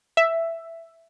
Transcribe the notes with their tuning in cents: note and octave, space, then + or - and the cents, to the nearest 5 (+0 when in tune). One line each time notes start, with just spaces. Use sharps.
E5 +5